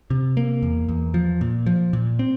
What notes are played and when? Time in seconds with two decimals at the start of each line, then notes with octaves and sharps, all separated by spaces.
0.10 C3
0.37 A#3
0.62 E2
0.89 E2
1.14 F3
1.41 A#2
1.66 F3
1.93 A#2
2.19 C4